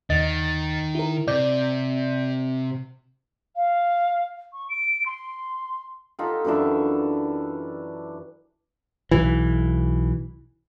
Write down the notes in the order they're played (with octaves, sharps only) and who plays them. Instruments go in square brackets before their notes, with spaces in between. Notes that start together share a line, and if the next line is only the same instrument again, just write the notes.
[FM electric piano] D#2 D#5 A6 [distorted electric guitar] D#3
[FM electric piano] E4 A#4
[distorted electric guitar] C3 [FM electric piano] D5 G6
[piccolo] F5
C#6
D7
C6
[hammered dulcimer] D#4 F4 G4 A4
F#2 E3 D4 E5
[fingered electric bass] B1 E3